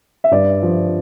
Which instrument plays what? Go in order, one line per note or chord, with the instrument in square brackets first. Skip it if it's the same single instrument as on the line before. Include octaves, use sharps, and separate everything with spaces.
[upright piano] E5
G2 D5
F3